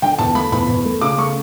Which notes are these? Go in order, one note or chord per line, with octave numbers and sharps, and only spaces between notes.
D3 G5
E2 A5
A3 B5
E2 B5
E2
A3
C#3 D6
A3 C#6